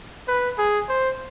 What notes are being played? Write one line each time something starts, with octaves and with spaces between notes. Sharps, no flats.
B4
G#4
C5